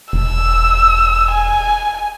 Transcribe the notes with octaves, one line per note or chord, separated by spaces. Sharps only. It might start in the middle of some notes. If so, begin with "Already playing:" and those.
E1 E6
G#5